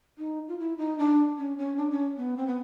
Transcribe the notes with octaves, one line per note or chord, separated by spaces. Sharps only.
D#4
F4
E4
D#4
D4
C#4
C#4
D4
C#4
B3
C4
B3